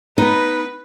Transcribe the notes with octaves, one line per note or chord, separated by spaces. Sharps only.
B3 D#4 B4